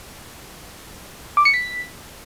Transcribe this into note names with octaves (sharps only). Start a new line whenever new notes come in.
D6
C#7
B6